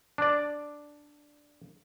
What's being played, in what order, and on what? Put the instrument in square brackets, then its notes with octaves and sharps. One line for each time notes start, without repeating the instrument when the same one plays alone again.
[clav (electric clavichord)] D4 D5